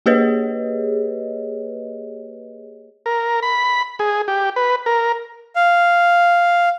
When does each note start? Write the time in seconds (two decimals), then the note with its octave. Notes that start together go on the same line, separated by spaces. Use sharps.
0.06 A#3 G4 G#4 B4 C#5 D#5
3.06 A#4
3.43 B5
3.99 G#4
4.28 G4
4.56 B4
4.86 A#4
5.56 F5